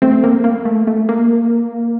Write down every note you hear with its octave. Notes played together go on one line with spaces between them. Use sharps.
A3 C4
A#3
A#3
A3
A3
A#3